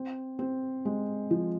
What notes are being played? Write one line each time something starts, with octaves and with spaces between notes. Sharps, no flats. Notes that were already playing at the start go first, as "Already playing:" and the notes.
Already playing: C4
C4
G#3
F3